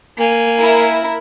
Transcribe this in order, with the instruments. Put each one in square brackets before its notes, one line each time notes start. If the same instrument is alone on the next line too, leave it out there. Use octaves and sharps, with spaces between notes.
[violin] A#3 G#5
[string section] E4 A#4